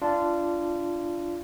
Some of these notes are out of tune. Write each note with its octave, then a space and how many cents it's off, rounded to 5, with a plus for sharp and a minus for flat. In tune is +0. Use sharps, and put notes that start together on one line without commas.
D4 -5 F4 -25